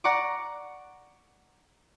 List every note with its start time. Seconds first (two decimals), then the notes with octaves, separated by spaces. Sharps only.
0.04 D5 F#5 A#5 C#6 D6